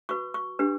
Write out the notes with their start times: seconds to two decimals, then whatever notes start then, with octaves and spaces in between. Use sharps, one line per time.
0.09 F#4 B4 C#6
0.34 C#6
0.59 D4 G4 B4